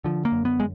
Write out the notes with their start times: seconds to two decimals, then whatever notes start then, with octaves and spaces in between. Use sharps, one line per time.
0.04 D3 F3
0.25 A#3
0.32 F#2
0.45 B3
0.60 G#3